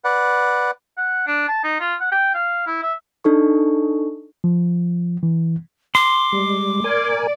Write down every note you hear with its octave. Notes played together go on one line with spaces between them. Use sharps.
B4 D5 F#5
F#5
D4
A5
D#4
F4
F#5
G5
F5
E4
E5
D4 D#4 A4 C#6
F3
E3
C6 D6
G3 G#3
A#4 D5 G#5